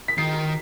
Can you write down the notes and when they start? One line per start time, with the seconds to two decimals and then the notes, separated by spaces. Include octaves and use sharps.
0.08 B6
0.18 D#3 C7